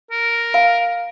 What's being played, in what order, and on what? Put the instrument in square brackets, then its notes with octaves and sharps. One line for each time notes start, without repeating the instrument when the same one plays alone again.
[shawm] A#4
[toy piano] F5